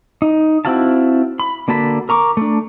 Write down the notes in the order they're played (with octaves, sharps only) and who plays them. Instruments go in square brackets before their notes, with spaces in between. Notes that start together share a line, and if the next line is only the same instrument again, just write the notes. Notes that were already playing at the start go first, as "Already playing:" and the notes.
[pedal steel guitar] D#4
C4 E4 F#4 F5 A5
B5
D3 A#3 F#4 A5 B5
A#4 A#5 C#6 D6
A3 D4